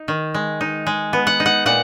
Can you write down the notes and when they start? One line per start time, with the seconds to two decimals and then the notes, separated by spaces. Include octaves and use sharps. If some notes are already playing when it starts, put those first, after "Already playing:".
Already playing: D#4
0.08 D#3
0.34 G#3
0.61 D#4
0.87 G#3
1.13 B3
1.27 F#5
1.40 D#4
1.46 F#5
1.66 A#2 F#5